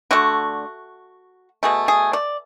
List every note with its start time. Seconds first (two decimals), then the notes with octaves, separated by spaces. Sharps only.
0.11 D3 A3 F#4
1.63 B2 A3 G#4
1.88 G#4
2.13 D5